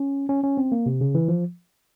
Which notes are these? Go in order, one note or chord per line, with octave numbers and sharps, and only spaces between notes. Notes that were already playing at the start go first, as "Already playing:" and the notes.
Already playing: C#4
C#4
C#4
C4
A#3
C3
C#3
E3
F3